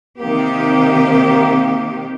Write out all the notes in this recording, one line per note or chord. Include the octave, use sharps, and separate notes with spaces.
C3 D#3 A#3 C4 G4